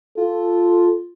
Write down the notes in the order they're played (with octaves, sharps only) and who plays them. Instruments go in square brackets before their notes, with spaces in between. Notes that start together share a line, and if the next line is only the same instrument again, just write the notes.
[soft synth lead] F4 [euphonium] A4